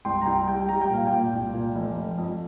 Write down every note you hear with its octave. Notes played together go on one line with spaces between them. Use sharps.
C2 G5 C6
A#5
C2 G5 C6
G3 G5
G3 A#5
G5
A#2 F5
A#2 G5
C2
A#2
F1
F1
F2